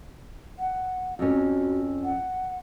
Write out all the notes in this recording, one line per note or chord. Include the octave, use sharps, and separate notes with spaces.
F#5
F2 C#4 F#4
F#5